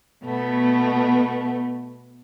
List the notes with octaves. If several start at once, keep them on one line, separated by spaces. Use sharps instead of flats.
B2 A3 B3